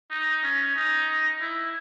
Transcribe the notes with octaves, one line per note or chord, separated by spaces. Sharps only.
D#4
C#4
D#4
E4